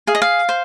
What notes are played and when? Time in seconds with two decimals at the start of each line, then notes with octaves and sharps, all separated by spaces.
0.07 G#4 F5
0.15 D#5
0.22 F5
0.49 C5